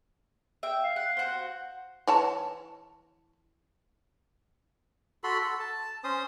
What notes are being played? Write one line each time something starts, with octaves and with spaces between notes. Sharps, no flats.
E5 G5
F5
F#5
F#4 C5
E3 C#5 A5
F#4 A4 B5 C6
A4
A5
C#4 C5 D#6